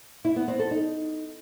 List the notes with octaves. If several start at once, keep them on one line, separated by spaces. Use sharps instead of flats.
E4
B3
C4
A4
D#4